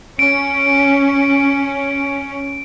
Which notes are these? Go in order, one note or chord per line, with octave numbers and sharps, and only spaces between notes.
C#4 D7